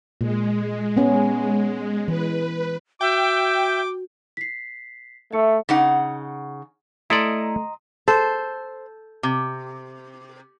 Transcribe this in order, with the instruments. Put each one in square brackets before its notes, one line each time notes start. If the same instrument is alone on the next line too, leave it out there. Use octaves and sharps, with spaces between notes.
[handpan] A#2 [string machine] G#3
[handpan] B3 C#4
[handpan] E3 [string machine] B4
[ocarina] F#4 [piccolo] E5 [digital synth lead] G5 [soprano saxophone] D6
[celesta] B6 C7
[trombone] A3 [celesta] E5 C#7
[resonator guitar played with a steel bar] C#3 D#4 F#5
[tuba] A3 [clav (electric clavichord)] E4 A4 D5 [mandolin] D#5 A#5 C6
[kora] A4 [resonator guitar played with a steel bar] C5
[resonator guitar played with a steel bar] C3